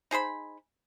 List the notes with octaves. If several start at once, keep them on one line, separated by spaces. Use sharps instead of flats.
D#4 G#4 C5 B5